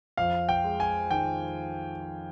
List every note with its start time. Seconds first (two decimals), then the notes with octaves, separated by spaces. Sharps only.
0.17 F2 F5
0.49 G5
0.64 G#3
0.80 G#5
1.11 D#3 G5